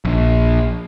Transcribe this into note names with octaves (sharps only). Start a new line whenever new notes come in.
A#1